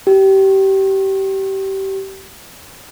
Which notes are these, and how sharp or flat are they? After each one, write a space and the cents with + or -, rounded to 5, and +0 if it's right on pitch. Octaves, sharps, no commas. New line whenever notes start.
G4 -25